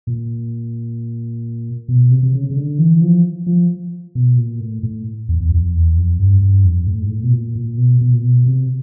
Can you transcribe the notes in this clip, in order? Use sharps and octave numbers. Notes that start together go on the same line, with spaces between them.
A#2
B2
C3
C3
C#3
C#3
D3
E3
F3
F3
B2
A#2
A2
A2
E2
E2
F2
E2
F2
G2
G2
F2
A2
G#2
A2
B2
A#2
A#2
B2
B2
A#2
B2
C3